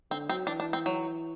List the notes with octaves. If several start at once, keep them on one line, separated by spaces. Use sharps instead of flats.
D3 C4
F#3 C4
E3 D4
D4
C4
F#3